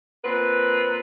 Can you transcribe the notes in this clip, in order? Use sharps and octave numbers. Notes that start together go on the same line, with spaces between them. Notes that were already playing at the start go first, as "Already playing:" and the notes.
A#2 C4 B4